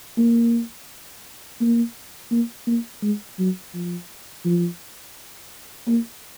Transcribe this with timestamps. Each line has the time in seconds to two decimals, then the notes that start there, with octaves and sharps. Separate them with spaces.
0.18 A#3
1.61 A#3
2.31 A#3
2.67 A#3
3.02 G#3
3.39 F#3
3.74 F3
4.45 F3
5.88 A#3